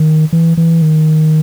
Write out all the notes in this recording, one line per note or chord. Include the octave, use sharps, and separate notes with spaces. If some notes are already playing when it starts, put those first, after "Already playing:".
Already playing: D#3
E3
E3
D#3